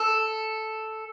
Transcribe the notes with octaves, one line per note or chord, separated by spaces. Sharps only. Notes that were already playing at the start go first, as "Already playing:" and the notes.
Already playing: A4